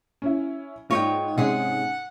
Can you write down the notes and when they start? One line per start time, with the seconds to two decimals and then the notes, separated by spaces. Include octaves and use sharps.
0.22 C#4 E4
0.91 G#2 F4 C#5 D#5 G5
1.38 C3 G#3 C#4 G#4 F#5 D#6